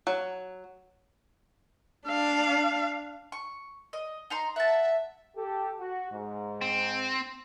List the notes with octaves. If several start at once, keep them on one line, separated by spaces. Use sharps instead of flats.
F#3
D4 F5
C#6
D#5
D#4 A#5 C6
E5 F#5 A5
G4 A4
F#4
G#2
C4